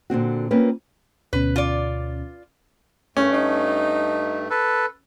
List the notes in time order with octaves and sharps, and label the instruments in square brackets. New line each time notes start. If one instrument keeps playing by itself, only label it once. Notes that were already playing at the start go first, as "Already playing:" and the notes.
[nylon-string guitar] A#2 D3 C4 F#4
A#3 C4 C#4 F4 B4
[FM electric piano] D2 B2 C#4 [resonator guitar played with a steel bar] B4
[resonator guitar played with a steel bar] F4 D5
[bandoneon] G2 A3 [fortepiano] C#4
[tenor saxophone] D#4
[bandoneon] A4 B4